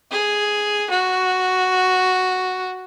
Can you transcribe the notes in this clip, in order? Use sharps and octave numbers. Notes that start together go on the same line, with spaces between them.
G#4
F#4